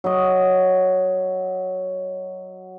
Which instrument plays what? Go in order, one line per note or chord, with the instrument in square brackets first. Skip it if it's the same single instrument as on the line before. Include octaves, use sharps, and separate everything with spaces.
[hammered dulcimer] F#3 D#5